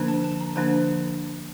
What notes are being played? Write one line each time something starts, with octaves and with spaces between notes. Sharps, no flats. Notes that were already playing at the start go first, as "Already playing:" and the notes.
Already playing: D3 F3 A#3 D4
A5
A5
A#5
D3 F3 A#3 D4 A5